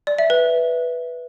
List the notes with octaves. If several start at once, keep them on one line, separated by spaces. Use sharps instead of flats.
D5
E5
B4